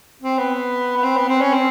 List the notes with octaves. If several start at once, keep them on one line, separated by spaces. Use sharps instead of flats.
C4
B3
B3
C4
B3
C4
C#4
C4